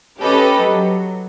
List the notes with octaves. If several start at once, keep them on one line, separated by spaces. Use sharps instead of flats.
C#4 G4 A4 B4 D#5
F#3